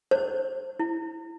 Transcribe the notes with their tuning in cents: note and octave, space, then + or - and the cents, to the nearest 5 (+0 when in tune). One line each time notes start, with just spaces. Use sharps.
C5 +5
E4 +0